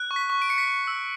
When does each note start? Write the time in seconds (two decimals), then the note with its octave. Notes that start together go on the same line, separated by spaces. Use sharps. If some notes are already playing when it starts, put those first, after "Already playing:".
Already playing: F#6
0.11 C#6
0.16 B6
0.30 C#6
0.42 D7
0.49 C#6 C#7
0.58 B6
0.65 C#6 C#7
0.87 E6